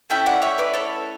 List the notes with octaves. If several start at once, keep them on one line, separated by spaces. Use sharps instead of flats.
A3 C#4 E4 E5 G5
D5 F#5
C#5 E5
B4 D5
A4 C#5